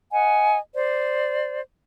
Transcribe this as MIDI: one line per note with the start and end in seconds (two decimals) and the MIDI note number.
0.11 0.57 75
0.11 0.57 78
0.11 0.57 80
0.73 1.59 72
0.73 1.59 74